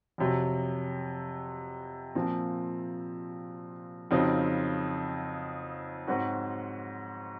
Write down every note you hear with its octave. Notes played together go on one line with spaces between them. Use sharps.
F2 C3 F#3
A#2 F3 C4
F2 C#3 F#3 C4 D#4
G#2 F#3 C4 F#4